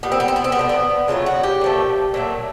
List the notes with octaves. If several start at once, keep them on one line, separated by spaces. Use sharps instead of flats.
A#2 G3 B3
C4
B3
C4
B3
C4
B3
G3
D3 C4
B3
C#3 F#3 A3 F4
F#4
G4
A#2 F3 A3
A#2 F#3 A3